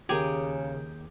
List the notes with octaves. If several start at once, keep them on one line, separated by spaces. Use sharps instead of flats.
D#2 C#3 G4 G#4 A#4